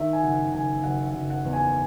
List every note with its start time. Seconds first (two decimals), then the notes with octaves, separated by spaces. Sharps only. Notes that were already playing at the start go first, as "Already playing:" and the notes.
Already playing: D#3 E5
0.13 G#5
0.23 F#1 F#5
0.53 F#1 G#5
0.84 F#1 F#5
1.07 F#5
1.15 F#1
1.30 F#5
1.45 E2
1.53 G#5